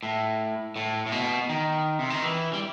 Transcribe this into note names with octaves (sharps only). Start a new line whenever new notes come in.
A2
A2
A2
B2
D#3
C3
D#3
E3
G3